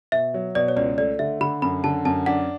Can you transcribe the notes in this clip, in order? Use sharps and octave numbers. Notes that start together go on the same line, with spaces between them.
B2 E5
F#3
B2 D5
C#5
C#2 D5
A3 D5
D3 E5
D3 B5
F#2 B5
D3 A5
F#2 A5
D4 F#5